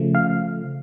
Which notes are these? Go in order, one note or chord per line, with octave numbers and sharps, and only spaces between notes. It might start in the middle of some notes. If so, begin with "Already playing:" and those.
Already playing: C#3 F3 A3
F5